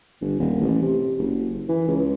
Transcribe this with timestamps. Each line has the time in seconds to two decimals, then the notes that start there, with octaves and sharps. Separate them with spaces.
0.22 G1
0.40 D#1
0.61 A1
0.82 C3
1.18 F#1
1.69 E3
1.88 C#2